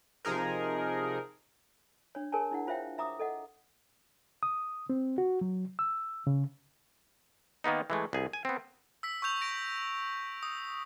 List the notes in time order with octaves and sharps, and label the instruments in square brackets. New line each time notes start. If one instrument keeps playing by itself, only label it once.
[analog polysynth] C3 F3 D#4 G#4 A#4
[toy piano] D4 C#5
G#4 A#4 C#5 G#5 A5
D4 E4 F#5
F4 C5 C#5 E5 F5 G5
E5 A#5 D6 D#6
A4 D#5 F#5
[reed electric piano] D#6
C4
F#4
F#3
E6
C#3
[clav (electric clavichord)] D#3 A#3 B3 D#4
E3 G#3 A3
C2 G#4
G#5
B3 C4
[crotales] E6 B6
C#6 E6 G6 F7
A#6 D7
D#6